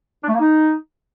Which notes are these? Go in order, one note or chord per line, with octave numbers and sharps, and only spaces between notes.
D4
A3
A#3
D#4